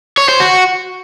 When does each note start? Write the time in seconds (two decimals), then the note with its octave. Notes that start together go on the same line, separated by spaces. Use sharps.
0.18 C#5
0.29 C5
0.40 F#4